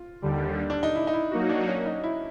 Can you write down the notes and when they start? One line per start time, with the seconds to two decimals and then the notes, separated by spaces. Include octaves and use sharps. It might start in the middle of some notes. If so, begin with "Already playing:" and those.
Already playing: F4
0.22 D#2 D3 G3
0.70 D4
0.83 D#4
0.95 E4
1.07 D#4
1.13 E4
1.31 F#3 A#3 D#4 F#4
1.49 D4
1.68 C#4
1.86 D#4
2.03 E4